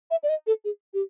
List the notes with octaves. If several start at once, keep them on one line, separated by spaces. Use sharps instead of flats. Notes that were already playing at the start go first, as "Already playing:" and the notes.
E5
D5
D#5
A4
G#4
G4